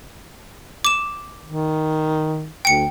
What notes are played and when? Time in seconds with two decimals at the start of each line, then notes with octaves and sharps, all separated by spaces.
0.85 D6 E7
1.46 D#3
2.65 D2 G5 C#7